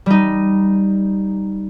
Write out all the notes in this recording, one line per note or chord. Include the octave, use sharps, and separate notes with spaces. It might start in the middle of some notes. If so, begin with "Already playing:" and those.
G3 D#4